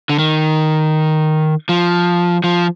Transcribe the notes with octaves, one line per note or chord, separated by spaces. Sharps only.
D3
D#3
F3
F3